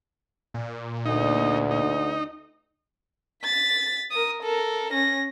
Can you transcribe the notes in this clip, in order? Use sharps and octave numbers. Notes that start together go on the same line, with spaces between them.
A#2
D2 D#4
D#4
A6 B6
A#4 D#6
A4 A#4
C#4 A#6